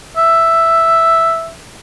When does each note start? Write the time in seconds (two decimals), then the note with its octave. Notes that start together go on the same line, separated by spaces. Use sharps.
0.17 E5